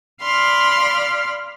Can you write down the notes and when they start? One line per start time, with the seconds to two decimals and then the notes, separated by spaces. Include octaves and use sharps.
0.21 D5 F5 B5 C6 F6